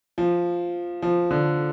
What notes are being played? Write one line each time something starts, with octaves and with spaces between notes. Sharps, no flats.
F3
F3
D3